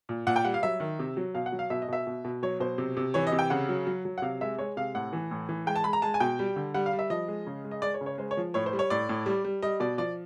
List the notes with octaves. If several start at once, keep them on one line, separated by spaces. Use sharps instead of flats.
A#2
A#2 F#5
G5
G3 F#5
F5
F#3 E5
D#3
C3
F#3
B2 F5
F#5
F#3
F5
B2 E5
D#5
B2 E5
B2
B2
F#3 C#5
B2 C5
C3
C3
E3 C#5
D#5
C3
G5
C#3 F#5
F#3
F#3
F#3
F#5
C3 F5
G#3 E5
G#3 C#5
C3 F5
A2 F#5
E3
A2
E3
G#3 G5
A5
G#3 B5
A#5
G#3 A5
G#5
B2 G5
G3
D3
G3 F#5
F5
G3
E5
F3 D#5
G#3
C#3
G#3
D#5
G#3 D5
C#5
C#3
C#5
G#3 C5
C#5
F3
A2 C#5
C5
G3
C#5
A2 D5
A2
G3
G3
G3 D#5
B2 D5
F3 D5